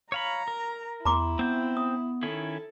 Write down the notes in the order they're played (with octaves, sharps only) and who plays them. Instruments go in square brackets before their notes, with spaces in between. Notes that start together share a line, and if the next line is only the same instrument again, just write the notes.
[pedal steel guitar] C#5 F5 B5 [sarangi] A#5
[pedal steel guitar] A#4
[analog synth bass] E2 [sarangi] E4 [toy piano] A#5 C6 D6
[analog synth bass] B3 [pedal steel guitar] C4 G6
[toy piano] D#6
[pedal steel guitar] D#3 C#4 E4 [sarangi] A4